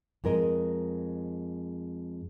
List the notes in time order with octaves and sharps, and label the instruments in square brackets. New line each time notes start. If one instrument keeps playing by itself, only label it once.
[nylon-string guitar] F2 G#3 A#4 D#5